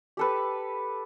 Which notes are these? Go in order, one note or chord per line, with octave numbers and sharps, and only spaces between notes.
G4 A4 B4